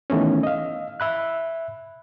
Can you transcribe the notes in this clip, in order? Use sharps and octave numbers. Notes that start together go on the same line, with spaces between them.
D#3 E3 A3 B3 C#4
D#5 F5
E5 B5 F#6